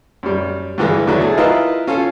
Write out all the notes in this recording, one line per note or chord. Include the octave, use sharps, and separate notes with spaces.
F#2 G3
G2 D3 E3 G#3
E2 D3 E3 F#3
A3 G#4
E4 F4 A#4 B4 D#5 F5
C#4 F4 A4